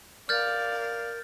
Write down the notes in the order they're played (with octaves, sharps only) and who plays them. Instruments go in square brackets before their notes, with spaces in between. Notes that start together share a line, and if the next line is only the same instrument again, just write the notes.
[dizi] A#4 [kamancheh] D5 F5 [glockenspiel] F6 G6 A6